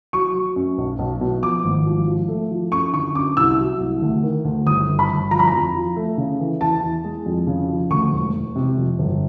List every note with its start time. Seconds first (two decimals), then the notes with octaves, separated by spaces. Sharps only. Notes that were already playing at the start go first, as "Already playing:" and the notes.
0.13 F#3 C#6
0.35 F#3
0.56 F#2
0.78 B1
0.99 B1
1.21 B2
1.42 F3 D6
1.64 G#1
1.86 F3
2.07 F3
2.28 A3
2.51 F3
2.72 F#2 C#6
2.93 D3 C#6
3.15 F#2 D6
3.37 C2 E6
3.59 F#3
3.80 C2
4.02 D2
4.23 D#3
4.45 D2
4.66 G1 D#6
4.88 G1
4.99 B5
5.10 G1
5.31 F3 A#5
5.39 B5
5.47 A#5
5.53 F2
5.74 F3
5.96 A3
6.17 C#3
6.39 E3
6.61 E2 A5
6.83 E2
7.04 G#3
7.26 F2
7.47 C#3
7.69 F3
7.90 D2 C#6
8.12 E1
8.34 E1
8.56 C3
8.77 F2
8.99 G1